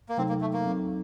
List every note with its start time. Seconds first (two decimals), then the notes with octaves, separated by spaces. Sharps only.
0.09 A#3
0.18 C3 F#3 A3 C4 D#4 A4
0.29 A#3
0.41 A3
0.53 A#3
0.66 F#3 C4 D#4 A4